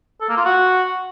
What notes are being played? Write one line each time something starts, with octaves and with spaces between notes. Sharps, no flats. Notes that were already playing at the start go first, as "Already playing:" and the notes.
A4
A#3
F4
F#4